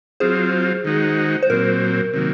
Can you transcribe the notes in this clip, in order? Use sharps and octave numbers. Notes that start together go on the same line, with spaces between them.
F#3 C4 F4 G#4 C5
D#3 G#3 D#4 F#4
C5
A#2 F#3 C4 A#4
C3 D#3 F#3 A#3